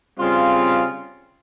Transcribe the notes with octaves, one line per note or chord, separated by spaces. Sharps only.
C#3 G3 C4 F4